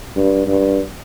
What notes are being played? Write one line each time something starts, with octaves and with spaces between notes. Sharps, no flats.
G2
G2